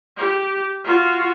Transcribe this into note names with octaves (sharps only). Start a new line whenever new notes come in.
G4
F4 F#4